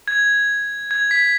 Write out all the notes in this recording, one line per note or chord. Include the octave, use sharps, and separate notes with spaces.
G#6
G#6
B6